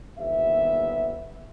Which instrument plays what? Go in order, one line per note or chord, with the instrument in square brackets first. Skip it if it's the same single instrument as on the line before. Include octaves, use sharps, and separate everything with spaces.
[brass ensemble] G1 D#2 C3 B3 E5